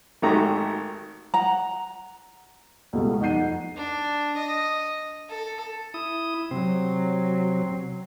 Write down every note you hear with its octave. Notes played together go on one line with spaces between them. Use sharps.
G#1 D#3 A3 F#4 G4 A#5
F#5 A#5
C#2 B2 G3 A3
F2 D#4 F#5 G6 C7 D#7
D4
D#5
A4
E4 D#6
C3 F#3 C4